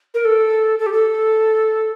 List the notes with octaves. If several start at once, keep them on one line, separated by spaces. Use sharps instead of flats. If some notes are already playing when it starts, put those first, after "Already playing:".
A#4
A4
A4
G4
A4